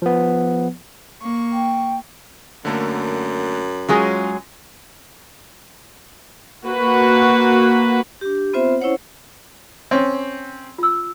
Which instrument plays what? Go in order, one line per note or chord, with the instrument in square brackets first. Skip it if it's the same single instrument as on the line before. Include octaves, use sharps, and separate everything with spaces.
[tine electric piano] F3 B3
[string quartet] A#3 C#6
[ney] G5
[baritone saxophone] F#2 [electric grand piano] D3 A3 A#3
[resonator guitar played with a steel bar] F#3 G#3 G#4 [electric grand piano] C#4 F4 A#6
[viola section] A#3 F#4 B4
[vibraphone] D4 G4
B3 C4 F4 C5 E5
C#4 E4 C5 C#5 F#5
[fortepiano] C4 C#4
[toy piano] F4 E6